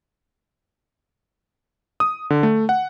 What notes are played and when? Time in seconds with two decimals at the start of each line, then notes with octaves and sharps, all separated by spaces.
2.00 D#6
2.30 D3
2.43 A3
2.69 F#5